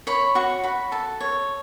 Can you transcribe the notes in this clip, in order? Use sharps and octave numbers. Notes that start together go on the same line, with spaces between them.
C#5 B5
F#4 C#6
F#4 B5
A4 A5
C#5